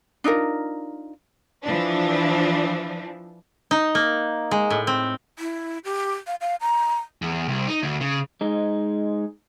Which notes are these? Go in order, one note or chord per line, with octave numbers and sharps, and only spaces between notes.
D4 D#4 F4 A#4
E3 F3 D4
D#4
A#3
G#3
A2
C4
E4
G4
F5
F5
A#5
E2
C2
D#4
D2
C#3
G#3 D#4